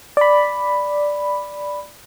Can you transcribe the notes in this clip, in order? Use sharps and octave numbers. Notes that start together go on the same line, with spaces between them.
D5 B5